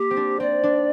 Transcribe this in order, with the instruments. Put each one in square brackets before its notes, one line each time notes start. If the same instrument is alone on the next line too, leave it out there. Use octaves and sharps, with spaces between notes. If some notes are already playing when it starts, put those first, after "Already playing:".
Already playing: [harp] A#3 [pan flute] G4
[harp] C4
D4
[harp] C4 [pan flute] D5
[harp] D4